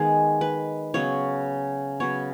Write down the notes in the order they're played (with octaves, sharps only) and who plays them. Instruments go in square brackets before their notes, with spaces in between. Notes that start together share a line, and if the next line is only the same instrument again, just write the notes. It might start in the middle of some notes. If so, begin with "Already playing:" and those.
Already playing: [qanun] D#3 G#3 B3 G#4
B4
C#3 F#3 B3 C#5
C#3 F#3 B3 C#5